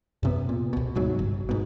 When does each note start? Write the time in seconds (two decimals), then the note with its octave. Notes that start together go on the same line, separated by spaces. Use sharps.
0.23 F#2 C3 B3
0.49 A#2
0.73 C2 B2
0.95 D1 C2 G#2 F#3
1.19 G1
1.49 G#2 B2